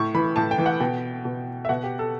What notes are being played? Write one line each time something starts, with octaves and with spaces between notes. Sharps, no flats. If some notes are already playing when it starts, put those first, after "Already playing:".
Already playing: A2 C#6
E3 B5
A2 A5
G5
E3
F#5
B2 G5
B2
E5
B2 F#5
G4
A4